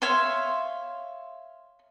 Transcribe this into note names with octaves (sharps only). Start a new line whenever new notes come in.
C#5 E5 F5 C6